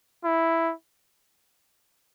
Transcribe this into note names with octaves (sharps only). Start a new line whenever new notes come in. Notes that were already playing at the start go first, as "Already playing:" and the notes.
E4